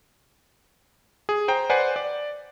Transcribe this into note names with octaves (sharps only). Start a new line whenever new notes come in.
G#4
C5 G5 A#5
B4 C5 D5 F#5 G#5
D5